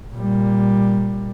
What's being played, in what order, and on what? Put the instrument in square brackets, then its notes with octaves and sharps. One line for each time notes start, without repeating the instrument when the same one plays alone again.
[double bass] A#2 G3